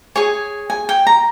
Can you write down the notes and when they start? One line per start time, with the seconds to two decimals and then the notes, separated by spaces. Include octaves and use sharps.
0.15 G#4 C#5 G#5
0.70 G#5
0.89 G5
1.07 A#5